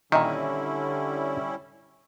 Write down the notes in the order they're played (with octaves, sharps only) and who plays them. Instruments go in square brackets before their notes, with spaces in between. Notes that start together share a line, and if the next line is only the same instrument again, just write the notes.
[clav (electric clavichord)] A#2 D#3 [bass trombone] D3 [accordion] G3 C#4 E4 [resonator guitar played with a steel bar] D#5 E5